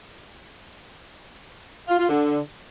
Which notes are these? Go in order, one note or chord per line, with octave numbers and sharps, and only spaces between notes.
F4
F4
D3